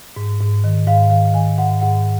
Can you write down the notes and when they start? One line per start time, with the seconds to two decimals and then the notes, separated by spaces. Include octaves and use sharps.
0.16 G#2
0.40 G#2
0.64 D#3
0.87 G#2 F5
1.10 D#3 F5
1.34 D#3 G#5
1.58 G#2 F#5
1.81 G#2 F#5